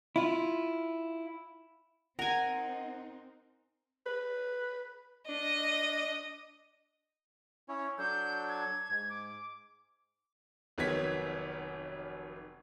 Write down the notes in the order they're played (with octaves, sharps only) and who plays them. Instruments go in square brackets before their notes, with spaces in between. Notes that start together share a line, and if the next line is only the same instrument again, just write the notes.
[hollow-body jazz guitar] E4 F4
[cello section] C4 D#4 [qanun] A#4 G#5 [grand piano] F#5 [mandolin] A#5
[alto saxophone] B4
[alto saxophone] D4 [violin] D#5
[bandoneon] C#4 E4 C#5
[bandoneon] F#3 D4 A4 [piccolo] G6
[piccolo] G#6
[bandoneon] G#2
[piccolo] D6
[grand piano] F1 D#3 F#3 B3 G#6 B6